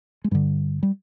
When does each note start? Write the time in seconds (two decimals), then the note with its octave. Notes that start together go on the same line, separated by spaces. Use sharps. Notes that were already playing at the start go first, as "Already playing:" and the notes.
0.24 G#3
0.31 G2 D3 G3
0.83 G3